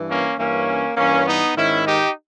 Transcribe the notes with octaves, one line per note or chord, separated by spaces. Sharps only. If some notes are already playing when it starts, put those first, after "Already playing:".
Already playing: G2 E3
A#3 C#4
G2 E3 A#3 C#4
G2 E3 A#3 C#4
B3 D#4
G#2 D#3 C#4 E4
D#4 G4